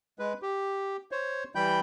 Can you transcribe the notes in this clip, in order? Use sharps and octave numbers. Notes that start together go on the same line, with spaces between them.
G#3 B4
G4
C5 C#5
E3 G3 G5 B5 G6